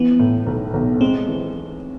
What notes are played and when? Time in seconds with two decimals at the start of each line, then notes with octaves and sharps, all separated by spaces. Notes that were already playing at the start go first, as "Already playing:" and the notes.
Already playing: E3 B3
0.19 A2
0.46 B1
0.74 B1
1.01 G#3 C4
1.28 E3